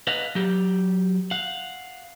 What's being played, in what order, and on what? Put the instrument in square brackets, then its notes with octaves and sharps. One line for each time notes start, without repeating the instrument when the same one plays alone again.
[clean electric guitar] B4 D#5 F5 F#5
F#3 G4
F5 F#5